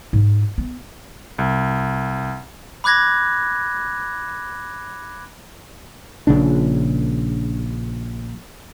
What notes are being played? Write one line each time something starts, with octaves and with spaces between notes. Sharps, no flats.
G#2
B3
C2
B5 D6 F#6 G#6 A#6
A#1 C#3 D4